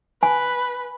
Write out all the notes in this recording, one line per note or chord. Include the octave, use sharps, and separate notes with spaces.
B4 G#5